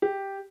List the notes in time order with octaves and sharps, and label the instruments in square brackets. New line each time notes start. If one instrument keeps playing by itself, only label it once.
[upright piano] G4